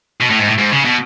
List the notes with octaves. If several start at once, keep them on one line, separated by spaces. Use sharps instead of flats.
B2
A2
G#2
A2
G#2
C#3
B2